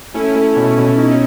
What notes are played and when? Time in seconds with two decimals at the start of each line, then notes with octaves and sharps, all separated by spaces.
0.14 A3 C#4 E4
0.35 A3
0.56 B2
0.77 B2
0.98 D#4